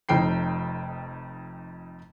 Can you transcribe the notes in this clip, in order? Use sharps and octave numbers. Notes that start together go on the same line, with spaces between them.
F1 F2 D#4 G5 C7